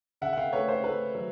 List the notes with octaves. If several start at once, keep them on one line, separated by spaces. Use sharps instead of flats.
C#3 E5 F#5
F#5
F5 G5
A3 B4 C#5
C5
A3 B4
F#3